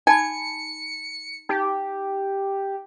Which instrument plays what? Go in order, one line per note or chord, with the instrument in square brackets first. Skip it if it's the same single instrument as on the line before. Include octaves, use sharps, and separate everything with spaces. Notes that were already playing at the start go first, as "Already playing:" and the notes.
[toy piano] D#4 A5 B5 [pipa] G#5 [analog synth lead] C#7
[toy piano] D#4 [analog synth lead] G4